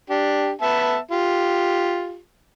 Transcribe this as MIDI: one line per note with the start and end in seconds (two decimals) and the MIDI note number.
0.10 0.51 62
0.10 0.51 67
0.61 0.97 59
0.61 0.97 76
0.61 0.97 81
1.11 2.19 65
1.11 2.19 67